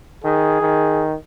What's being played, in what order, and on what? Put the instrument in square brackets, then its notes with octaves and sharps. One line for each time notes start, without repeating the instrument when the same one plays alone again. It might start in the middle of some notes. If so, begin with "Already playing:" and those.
[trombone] D#3 [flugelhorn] G#4
[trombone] D#3